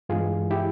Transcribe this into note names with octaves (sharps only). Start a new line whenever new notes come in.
G2 E3 G#3 F4 G#4
E4 G4